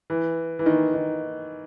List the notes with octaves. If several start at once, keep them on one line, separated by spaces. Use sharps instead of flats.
E3
E3
D#3
D#3